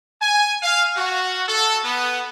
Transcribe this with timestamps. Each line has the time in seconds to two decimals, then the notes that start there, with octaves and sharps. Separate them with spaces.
0.21 G#5
0.62 F5
0.97 F#4
1.48 A4
1.84 B3